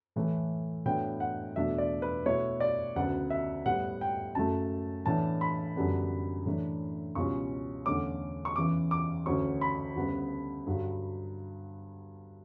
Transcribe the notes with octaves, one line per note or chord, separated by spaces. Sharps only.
A2 E3 A3
A2 F#3 B3 D4 G5
F#5
E2 B2 A3 D4 E5
D5
B4
B2 A3 E4 C#5
D5
D2 C#3 F#3 B3 F#5
E5
A2 G3 B3 F#5
G5
F#2 C#3 F#3 A3 A5
A2 E3 B3 D4 A5
B5
F#2 D3 G3 B3 D4
A2 E3 A3 D4
C#2 B2 G3 C#4 C#6
E2 D3 A3 C#4 D6
C#6
E2 C#3 E3 D6
D6
D2 C#3 F#3 C#4 C#6
B5
D2 C#3 G3 B3
G2 D3 F#3